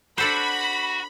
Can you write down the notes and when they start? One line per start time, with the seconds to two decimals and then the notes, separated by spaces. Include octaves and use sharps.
0.18 D4 F#4 A4 C5 F#5 B5